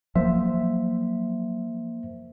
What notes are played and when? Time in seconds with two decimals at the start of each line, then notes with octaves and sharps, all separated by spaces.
0.16 F3 F#3 A#3 C5 E5